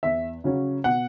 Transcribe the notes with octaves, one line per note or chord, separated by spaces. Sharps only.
E2 E5
C#3 F#3 C#4
B2 F#5